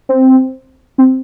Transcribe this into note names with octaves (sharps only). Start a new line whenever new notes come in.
C4
C4